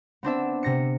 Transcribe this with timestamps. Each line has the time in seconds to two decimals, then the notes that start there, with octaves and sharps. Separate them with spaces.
0.23 B3 C4 D4 E5
0.63 C3 A#6 C#7